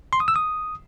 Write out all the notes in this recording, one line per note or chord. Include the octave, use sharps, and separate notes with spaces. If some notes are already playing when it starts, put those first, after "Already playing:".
C6
D#6
E6
D#6